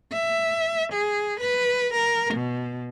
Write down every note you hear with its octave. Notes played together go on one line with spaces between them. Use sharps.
E5
G#4
B4
A#4
B2